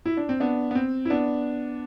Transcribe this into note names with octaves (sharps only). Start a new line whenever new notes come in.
E4
D4
C4
B3 D4
B3
C4
E4
B3 D4